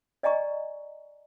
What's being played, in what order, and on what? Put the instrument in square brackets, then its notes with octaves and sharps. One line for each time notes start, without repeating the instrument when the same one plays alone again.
[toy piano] D5 D#5 G#5 A#5 C#6